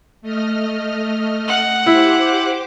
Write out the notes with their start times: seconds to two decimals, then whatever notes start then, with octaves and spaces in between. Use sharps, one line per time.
0.22 A3 D#5 F6
1.48 F#5
1.86 E4 G4 C5 D6